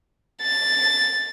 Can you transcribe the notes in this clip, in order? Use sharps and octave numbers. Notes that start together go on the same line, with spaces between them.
A6